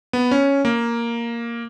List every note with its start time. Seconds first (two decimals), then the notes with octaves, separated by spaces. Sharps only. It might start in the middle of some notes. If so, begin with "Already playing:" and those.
0.13 B3
0.31 C#4
0.65 A#3